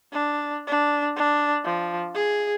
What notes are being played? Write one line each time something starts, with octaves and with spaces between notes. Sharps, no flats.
D4
D4
D4
F3
G#4